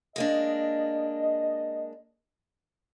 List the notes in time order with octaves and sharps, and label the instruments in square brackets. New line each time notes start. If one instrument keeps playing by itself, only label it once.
[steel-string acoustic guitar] G#3 A#3 D4 [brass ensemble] D#5